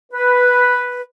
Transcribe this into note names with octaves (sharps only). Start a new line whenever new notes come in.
B4